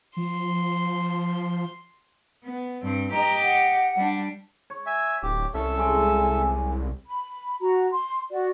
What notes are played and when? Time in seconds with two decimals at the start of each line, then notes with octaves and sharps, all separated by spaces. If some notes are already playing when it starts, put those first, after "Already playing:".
0.17 F3 C6
2.45 B3
2.83 G2 C4
3.12 G4 D#5 A#5
3.44 F#5
3.96 G3 D4
4.70 C#5
4.86 E5 G#5
5.23 D1 G4
5.54 C2 C#4 A4 E5
5.78 G#3 G#5 D6
7.06 B5
7.61 F#4 A#5
7.91 C6
8.31 F#4 D5